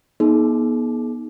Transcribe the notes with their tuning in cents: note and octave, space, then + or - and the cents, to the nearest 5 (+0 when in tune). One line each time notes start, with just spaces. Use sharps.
B3 -35 D#4 +10 G#4 +40